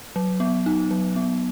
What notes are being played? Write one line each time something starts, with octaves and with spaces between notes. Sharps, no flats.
F#3
B3
D#4
F#3
B3